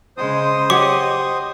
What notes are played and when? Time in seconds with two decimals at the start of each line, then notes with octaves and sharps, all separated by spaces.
0.17 C#3 G#3 C5 D#6
0.70 G4 C#5 D#5 F#5 D6